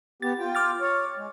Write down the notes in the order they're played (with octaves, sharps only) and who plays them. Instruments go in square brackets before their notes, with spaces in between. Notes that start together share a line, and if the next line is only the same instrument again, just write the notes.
[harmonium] B3 G4 [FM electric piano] A6
[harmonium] F4 G5
[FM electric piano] D6 F6 A6
[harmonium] C#5
G#3